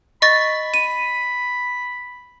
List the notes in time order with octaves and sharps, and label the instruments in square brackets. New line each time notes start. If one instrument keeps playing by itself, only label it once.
[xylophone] D#5 C#6 A6 [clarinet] B5
[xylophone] D#7